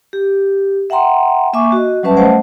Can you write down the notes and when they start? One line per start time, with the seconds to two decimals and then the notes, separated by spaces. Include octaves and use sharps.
0.13 G4
0.90 E5 F#5 G5 A#5 C6
1.53 A#3 E5 G#5 C#6 D6
1.72 F#4 D#5
2.03 F#3 G3 C#4 B4 E5 A5
2.17 A3 C5 D#5 F5 F#5 A5